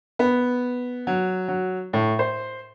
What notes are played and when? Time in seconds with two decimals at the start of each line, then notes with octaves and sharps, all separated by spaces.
0.19 B3
1.07 F#3
1.48 F#3
1.93 A2
2.19 C5